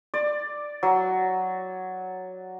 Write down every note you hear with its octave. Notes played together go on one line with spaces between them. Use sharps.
D5
F#3